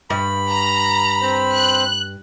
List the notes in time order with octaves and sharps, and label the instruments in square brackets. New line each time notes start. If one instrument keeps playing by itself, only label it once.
[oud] G2 [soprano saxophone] B5
[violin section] A#5
[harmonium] C4 C5
[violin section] F#6